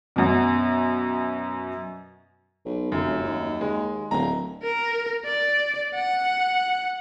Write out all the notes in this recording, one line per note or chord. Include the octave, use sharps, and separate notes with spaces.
F#2 B2
B1
F1 F#2
D#2
G#3
D1 A#5
A#4
D5
F#5